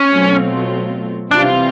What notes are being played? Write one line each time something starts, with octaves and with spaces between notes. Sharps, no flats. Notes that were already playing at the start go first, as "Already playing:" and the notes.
Already playing: C#4
B2 F#3 A3 C4 F4
C3 E3 G3 C4 D4 F4